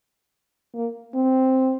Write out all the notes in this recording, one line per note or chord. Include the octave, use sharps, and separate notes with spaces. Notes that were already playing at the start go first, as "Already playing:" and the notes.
A#3
C4